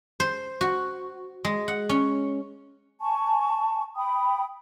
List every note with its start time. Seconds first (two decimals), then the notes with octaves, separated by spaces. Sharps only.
0.20 C5
0.61 F#4
1.45 G#3
1.68 F#5
1.89 C#4
3.00 G#5 A5 C#6
3.96 G5 B5 D#6